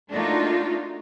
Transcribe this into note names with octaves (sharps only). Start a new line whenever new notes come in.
A3 A#3 D4 D#4 F4 F#4